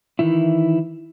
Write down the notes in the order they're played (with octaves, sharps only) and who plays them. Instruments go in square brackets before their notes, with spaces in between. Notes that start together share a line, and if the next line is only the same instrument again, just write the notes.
[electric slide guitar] D#3 E3 E4